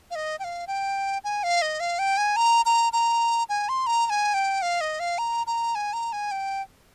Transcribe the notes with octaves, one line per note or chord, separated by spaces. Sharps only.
F5
D#5
G5
F5
G5
G#5
F5
D#5
F5
G5
G#5
A#5
A#5
A#5
G#5
C6
A#5
A#5
G#5
G5
F5
D#5
F5
A#5
A#5
G#5
A#5
G#5
G5